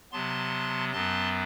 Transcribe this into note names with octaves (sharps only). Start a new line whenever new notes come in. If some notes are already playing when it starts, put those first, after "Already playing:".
C3 F#3 B3 A5 C6
F#2 F#3 B3 A5 C6